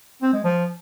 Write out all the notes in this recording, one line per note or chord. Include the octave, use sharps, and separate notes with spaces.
C4
G#3
F3